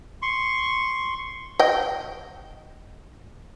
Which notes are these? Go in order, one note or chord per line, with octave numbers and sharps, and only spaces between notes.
C6 C#6
D#5 G5